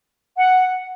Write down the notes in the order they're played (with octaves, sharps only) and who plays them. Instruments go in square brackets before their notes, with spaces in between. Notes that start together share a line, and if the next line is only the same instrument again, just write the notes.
[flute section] F#5